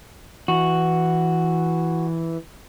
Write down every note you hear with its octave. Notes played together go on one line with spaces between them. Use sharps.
E3 F#4